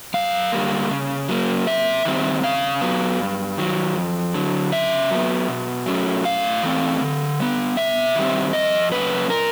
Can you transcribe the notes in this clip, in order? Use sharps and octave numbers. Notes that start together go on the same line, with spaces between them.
F#2 F5
D3 G3 A#3
C#3
F#3 A#3 C#4
C3 E5
D#3 G3 C4
C#3 F5
F#3 B3
G2
D#3 F#3
F2
D3 F#3
C#3 E5
F#3 B3
B2
F#3 A3 C#4
A2 F5
E3 A3 C4
D3
G3 B3
C3 E5
D#3 G3 C4
F2 D#5
C#3 F#3 A#3 C#4 B4
A#2 A#4